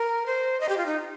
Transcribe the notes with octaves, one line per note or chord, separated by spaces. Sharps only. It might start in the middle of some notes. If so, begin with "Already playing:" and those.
Already playing: A#4
C5
D#5
G4
F4
D#4